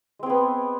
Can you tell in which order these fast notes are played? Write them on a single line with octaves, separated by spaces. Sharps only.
G#3 C4 G#4 B3